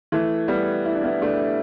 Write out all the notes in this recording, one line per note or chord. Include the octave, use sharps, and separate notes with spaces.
E3 A3
G3 B3
E4
D4
B3 E4
A3 D4